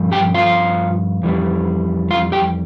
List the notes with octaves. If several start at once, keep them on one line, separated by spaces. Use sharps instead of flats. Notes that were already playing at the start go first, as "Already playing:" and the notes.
Already playing: G2 F3
G4 G5
F4 F5
F2 E3 G3
F4 F5
G4 G5